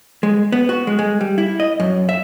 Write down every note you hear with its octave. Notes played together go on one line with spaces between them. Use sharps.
G#3
B3
F#4
G#3
G#3
G3
E4
D#5
F#2
E5